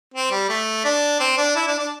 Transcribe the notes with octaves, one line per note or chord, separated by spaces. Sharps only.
C4
G3
A3
D4
C4
D4
E4
D4
D4